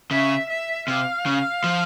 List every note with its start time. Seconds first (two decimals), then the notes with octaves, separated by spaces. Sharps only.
0.11 C#3 E5
0.49 E5
0.88 C3 F5
1.26 C#3
1.64 F3